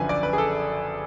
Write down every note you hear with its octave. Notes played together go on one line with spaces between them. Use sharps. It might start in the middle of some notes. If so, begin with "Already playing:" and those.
Already playing: F#1 F#2 D3 F3 B4 G#5
D5
B4
G#4
A4